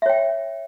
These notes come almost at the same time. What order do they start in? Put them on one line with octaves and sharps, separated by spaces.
E5 C#5 G5